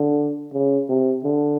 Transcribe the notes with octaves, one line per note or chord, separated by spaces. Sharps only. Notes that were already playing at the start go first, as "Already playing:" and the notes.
Already playing: D3
C#3
C3
D3